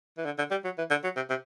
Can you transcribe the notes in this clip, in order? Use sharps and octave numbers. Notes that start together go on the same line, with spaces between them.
E3
D3
D3
G3
F#3
E3
D3
F#3
C3
C3